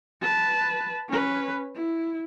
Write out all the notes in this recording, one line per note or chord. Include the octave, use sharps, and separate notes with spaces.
B4 A5
C#4 B4
E4